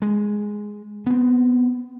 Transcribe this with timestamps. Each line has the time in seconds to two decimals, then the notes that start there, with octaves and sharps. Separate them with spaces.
0.02 G#3
1.07 B3 C4